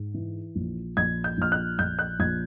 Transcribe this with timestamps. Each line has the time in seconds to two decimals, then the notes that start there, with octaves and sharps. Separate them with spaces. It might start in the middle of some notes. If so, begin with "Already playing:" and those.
Already playing: G#2
0.14 E3
0.55 A#1
0.97 A#1 G#6
1.24 G6
1.38 A#1 F6
1.52 F#6
1.79 A#1 G6
1.99 F#6
2.19 A#1 G#6